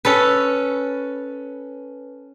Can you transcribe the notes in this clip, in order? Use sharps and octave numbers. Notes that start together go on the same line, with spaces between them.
C#4 A4 B4